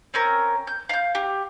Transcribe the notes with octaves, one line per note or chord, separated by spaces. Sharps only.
C4 C#4 A#4
G6
F5 G6
G4